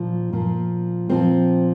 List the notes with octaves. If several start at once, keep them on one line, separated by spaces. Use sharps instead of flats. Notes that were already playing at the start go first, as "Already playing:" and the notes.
Already playing: A#2 F3
A#2 F3
A#2 F3 C4